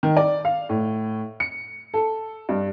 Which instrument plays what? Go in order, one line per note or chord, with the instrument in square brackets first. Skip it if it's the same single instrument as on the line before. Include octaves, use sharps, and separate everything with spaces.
[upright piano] D#3
D5
F5
A2
C#7
A4
G2